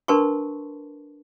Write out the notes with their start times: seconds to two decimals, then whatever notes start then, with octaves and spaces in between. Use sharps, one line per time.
0.08 D4 A#4 B4 A5 C6 C#6